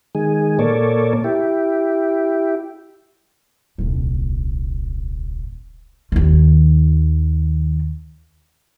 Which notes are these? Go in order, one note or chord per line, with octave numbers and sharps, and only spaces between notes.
D#3 G#3 G#4
A#2 A#3 A4 C#5 D5
E4 G4
D#1 C2
D#2 D#3